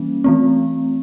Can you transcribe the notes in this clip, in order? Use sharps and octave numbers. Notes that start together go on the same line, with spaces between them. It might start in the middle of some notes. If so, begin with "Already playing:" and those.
Already playing: E3 G3 A#3 C#4
E3 A3 C4